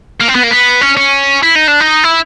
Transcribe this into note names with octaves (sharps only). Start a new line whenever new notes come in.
A#3
C4
B3
A#3
B3
C#4
C#4
E4
D#4
D4
D#4
E4